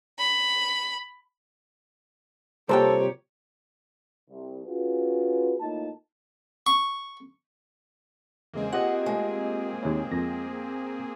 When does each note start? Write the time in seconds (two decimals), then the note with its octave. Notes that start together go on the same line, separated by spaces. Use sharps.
0.18 B5
2.69 C2 A#2 G4 A4 C5 C#5 G5 A#5
4.29 C2
4.65 C#4 F4 F#4 G#4 B4
5.61 A2 A#3 D#4 F4 A5
6.67 C#6
8.54 E2 C#3 G#3 A#3 C4 G#4
8.73 F4 G4 D#5 F#5
9.06 G#3 A3
9.83 D#2 E4 C#5
10.12 F2 A#6